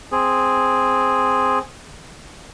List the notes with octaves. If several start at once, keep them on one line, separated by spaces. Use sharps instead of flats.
C4 G#4